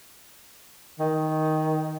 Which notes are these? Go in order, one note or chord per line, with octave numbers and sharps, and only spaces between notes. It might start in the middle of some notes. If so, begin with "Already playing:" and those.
D#3